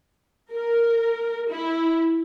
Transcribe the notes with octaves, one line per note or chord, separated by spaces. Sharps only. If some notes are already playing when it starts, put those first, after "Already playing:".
A#4
E4